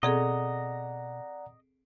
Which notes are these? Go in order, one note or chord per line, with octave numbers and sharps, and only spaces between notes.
B2 C4 G#4 A4 D5 D#5 F#5 A#5